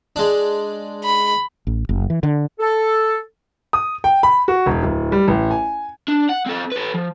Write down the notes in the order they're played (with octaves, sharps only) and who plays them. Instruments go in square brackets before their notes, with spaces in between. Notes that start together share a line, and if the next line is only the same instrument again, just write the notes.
[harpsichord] G#3 D4
[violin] B5
[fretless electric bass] A1
F#1
E3
D3
[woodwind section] A4
[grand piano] D#6
G5
B5
F#4
E1
D1
G3
A1
G#5
[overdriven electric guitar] D4
F#5
C4 A4
A4 B4
F3